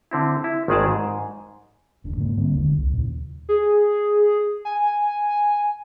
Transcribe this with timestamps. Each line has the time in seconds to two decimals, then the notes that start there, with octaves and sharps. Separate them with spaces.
0.11 D3 C4 E4
0.44 E4
0.68 G#1 D#3 G#3 G#4 D5 A5
0.89 G#2
2.04 D#1 D2 D4
2.17 G#2 C#3 G#3 A#3
2.37 D3 G3 A#3 C4
2.53 F1 D#2 D3 G#3
2.78 C2
2.91 D#2 A#2 C#3
3.49 G#4
4.65 G#5